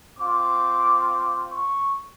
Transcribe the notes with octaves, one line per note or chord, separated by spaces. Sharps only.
C4 F4 D6
C#6